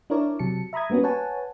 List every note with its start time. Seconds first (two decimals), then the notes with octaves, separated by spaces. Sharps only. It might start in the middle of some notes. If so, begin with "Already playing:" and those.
0.10 D4 E4 A#4 C#5 D5
0.39 C3 F#3 A5 C#7
0.73 E5 A#5 B5 D#6 G#6
0.90 G3 A#3 B3 C#4 F#4
1.03 B4 C#5 F#5 G#5 A5